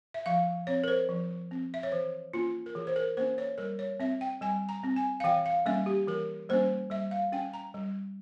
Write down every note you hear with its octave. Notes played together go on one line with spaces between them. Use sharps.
E5
F3 F5
C4 C#5
A#4
C5
F3
C4
E5
C#5
E3 C5
A#3 C#4 F4
A#4
E3 G#4
C5
A#4
A#3 C#4 C5
C#5
G3 A#4
C#5
C4 E5
G5
G3 G#5
A#5
C4
G#5
F5
E3 G5
F5
G3 A#3 C#4 E5
G4
E3 A#4
G3 A#3 C#4 C5
G3 E5
F5
C#4 G5
A#5
G3